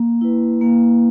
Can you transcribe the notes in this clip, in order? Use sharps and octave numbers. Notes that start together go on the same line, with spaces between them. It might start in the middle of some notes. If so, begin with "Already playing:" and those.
Already playing: A#3
E4 B4
A#3